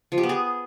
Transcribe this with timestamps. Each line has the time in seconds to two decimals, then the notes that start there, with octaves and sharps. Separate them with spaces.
0.12 F3
0.18 G4
0.23 B3
0.29 G#4